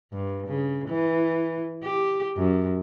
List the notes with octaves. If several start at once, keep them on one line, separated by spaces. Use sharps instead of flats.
G2
C#3
E3
G4
F#2